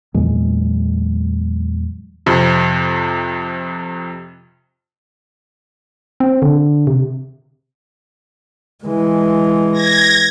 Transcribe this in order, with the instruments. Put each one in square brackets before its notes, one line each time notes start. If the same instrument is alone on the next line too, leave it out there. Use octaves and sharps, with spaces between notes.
[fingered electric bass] E2 A#2 F#3 G#3
[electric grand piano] F2 C3
[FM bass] C4
D3
C3
[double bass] E3 G#3
[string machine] G#6 A#6